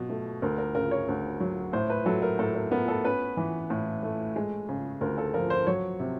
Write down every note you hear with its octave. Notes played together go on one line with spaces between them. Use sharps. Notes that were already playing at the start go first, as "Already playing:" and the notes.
Already playing: B2 F#3
A3
D2 A#4
A#4
C#3 A#4
C#5
D2
F#3
A2 C5
B4
F#3 A4
A#4
A2 A4
A#4
B3 A#4
A4
C#4 B4
E3
A2
A3
G#3
C#3
D2 A#4
A4
F3 A#4
C5
F#3 C#5
C3